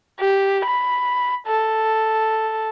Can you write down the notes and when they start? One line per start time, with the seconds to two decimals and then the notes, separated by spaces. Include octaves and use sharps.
0.20 G4
0.65 B5
1.47 A4